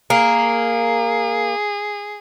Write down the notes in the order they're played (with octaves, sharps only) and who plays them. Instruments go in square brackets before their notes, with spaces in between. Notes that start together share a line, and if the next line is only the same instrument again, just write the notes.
[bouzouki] A#3 [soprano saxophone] G#4